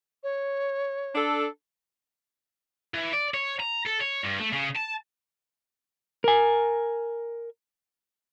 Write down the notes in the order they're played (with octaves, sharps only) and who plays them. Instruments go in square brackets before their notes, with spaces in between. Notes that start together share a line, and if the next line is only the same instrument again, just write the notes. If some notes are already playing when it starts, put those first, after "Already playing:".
[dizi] C#5
[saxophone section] D4 A4
[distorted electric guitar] E3
D5
C#5
A#5
A4
C#5
G2
A3
C#3
A5
[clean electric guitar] A#4 G#5